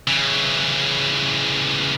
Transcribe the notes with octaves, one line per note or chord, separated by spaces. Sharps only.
C#3 E3